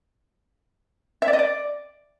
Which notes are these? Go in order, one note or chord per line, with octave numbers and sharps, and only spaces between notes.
E5
D5
D#5
D5